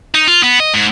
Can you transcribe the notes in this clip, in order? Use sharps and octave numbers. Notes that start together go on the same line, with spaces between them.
D#4
F4
B3
D#5
G#2